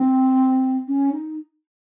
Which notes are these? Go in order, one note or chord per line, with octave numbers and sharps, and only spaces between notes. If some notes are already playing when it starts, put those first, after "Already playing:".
Already playing: C4
C#4
D#4